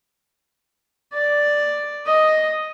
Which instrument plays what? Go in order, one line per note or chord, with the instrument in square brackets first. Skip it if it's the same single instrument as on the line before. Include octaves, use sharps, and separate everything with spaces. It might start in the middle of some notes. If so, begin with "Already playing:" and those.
[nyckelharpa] D5
D#5